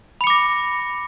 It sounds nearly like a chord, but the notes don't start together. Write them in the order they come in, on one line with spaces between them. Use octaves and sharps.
B5 C#7 D6 A#6